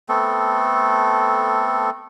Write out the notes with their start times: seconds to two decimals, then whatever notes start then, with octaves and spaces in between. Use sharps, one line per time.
0.09 A3 B3 C4 A4